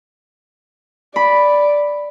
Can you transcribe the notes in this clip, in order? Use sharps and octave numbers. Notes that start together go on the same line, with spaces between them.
D5 B5